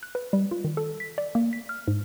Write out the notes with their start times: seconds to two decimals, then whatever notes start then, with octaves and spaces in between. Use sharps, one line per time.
0.03 F#6
0.15 B4
0.33 G3
0.51 F4
0.64 D#3
0.77 A4
1.00 B6
1.18 D5
1.35 A#3
1.53 B6
1.69 F6
1.88 G#2